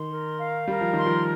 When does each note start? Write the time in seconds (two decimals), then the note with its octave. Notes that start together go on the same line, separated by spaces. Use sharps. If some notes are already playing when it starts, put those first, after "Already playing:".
Already playing: D#3 C6
0.09 A#4
0.39 F5
0.68 G3 A#4
0.81 F3
0.93 D#3 C6
1.06 F3